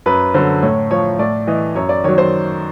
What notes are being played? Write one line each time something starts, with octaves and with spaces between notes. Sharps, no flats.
F#2 B4
D3 F#3 C5
A2 C#5
F3 C#5
A2 D5
E3 D#5
F#2 C#5
D5
D#3 F#3 C#5
C5